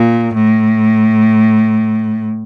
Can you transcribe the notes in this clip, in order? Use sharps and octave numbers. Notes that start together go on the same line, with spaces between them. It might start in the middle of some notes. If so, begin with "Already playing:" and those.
Already playing: A#2
A2